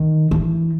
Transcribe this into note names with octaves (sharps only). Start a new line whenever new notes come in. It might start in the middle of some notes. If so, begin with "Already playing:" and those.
Already playing: D#3
E3